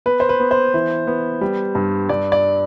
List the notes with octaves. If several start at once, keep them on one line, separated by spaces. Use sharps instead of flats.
B3 B4
C5
B4
B3
C5
E3
B3
G3
G2
G2 D5
D5